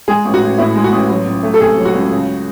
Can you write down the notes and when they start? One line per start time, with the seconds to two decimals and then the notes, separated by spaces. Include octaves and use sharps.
0.08 G#3 G#4
0.25 A1
0.34 F#4
0.42 A1
0.58 A2 E4
0.75 G#3
0.84 F#4
0.92 A1
1.10 F#3
1.26 C#2
1.43 A3
1.54 A4
1.60 C3 G#4
1.78 F#3
1.85 F#4
1.94 C#2
2.12 C#3